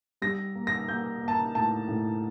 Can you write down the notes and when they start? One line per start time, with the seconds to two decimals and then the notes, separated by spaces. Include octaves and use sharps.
0.22 G3 A#6
0.55 A#3
0.67 A#6
0.88 A#3 G6
1.22 A#3
1.28 A5
1.33 A#5
1.55 A2 A5
1.88 A2